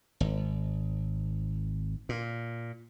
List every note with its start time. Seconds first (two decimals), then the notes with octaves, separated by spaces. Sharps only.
0.20 G#1
2.09 A#2